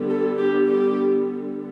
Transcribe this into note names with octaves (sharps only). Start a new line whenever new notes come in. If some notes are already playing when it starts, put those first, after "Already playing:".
Already playing: D3 G3 B3
A4
G4
G4